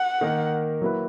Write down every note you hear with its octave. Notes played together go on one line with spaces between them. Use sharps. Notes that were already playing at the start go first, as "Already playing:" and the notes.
Already playing: F#5
D#3 A#3 D#4 A#4
F#3 A#3 E4 B4